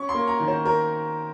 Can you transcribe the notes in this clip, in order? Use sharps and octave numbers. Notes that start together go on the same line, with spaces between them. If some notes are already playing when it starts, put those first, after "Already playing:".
Already playing: C#4 C#6
C6
A#3
A#5
D#3
C5
A#4